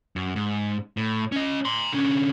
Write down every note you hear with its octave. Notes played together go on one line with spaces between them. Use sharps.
F#2
G#2
A2
C#4 D#5
A#5 C6
D3 C#4